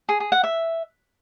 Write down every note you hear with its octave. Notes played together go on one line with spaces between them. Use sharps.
G#4
G#4
F#5
E5